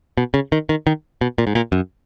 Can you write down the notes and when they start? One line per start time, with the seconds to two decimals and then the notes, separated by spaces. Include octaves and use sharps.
0.17 B2
0.34 C#3
0.52 D#3
0.69 D#3
0.87 D#3
1.21 B2
1.38 A#2
1.47 G#2
1.55 A#2
1.72 F#2